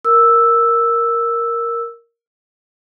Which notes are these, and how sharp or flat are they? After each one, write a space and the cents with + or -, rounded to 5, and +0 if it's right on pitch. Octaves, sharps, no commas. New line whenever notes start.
A#4 +0 E6 +0